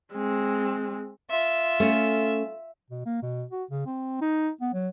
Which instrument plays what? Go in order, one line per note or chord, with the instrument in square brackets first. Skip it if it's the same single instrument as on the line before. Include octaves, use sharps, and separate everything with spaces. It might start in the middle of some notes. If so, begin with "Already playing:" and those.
[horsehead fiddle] G#3 C4
[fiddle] F4 E5
[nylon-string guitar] A3 C#4
[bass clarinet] B2
A#3
B2
F#4
C#3
C4
D#4
B3
F#3